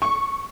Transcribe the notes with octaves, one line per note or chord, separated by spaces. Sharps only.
C#6